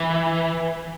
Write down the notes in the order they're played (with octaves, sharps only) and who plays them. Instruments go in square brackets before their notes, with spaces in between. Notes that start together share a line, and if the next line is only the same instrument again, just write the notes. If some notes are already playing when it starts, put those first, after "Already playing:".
Already playing: [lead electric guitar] E3